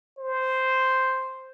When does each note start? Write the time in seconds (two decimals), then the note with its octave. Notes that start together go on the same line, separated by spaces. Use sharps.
0.18 C5